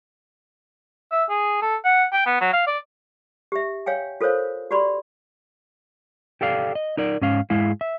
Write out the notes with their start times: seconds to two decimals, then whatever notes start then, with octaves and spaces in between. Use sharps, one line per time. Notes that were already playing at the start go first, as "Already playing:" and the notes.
1.12 E5
1.30 G#4
1.62 A4
1.84 F#5
2.13 G5
2.26 B3
2.41 F#3
2.53 F5
2.67 D5
3.52 G4 E5
3.86 C#5 F5 G5 G#5
4.21 F4 A4 A#4 C5 C#5 F5
4.71 F#4 G4 D5 B5 C6
6.41 G4 A4 D5 F5
6.75 D#5
6.97 D#4 A#4 D5
7.21 G#2 C#4 F5
7.50 G#2 G#3 E4 F5
7.81 E5